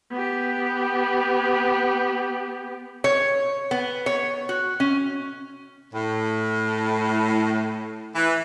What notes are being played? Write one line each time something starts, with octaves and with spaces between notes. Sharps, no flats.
B3 G4
C#5
B3
C#5
F#4
C#4
A2
E3